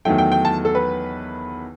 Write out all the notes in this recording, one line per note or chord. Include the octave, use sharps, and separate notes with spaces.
E2 D#3 F#3 A3 G5
G5
G5
A5
A4
B4